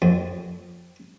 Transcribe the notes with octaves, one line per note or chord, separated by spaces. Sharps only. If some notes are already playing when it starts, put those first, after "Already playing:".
F2